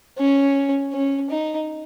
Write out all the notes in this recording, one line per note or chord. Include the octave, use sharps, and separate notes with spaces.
C#4
C#4
D#4